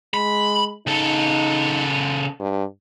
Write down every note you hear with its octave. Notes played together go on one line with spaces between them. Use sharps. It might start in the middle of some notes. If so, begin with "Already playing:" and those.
G#3 B5
C#3 D#4 A4
G2